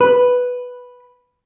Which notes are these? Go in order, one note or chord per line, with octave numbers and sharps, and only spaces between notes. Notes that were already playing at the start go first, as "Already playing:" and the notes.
B4